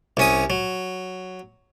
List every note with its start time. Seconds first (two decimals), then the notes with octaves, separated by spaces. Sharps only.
0.17 C2 C#4 D#6
0.50 F#3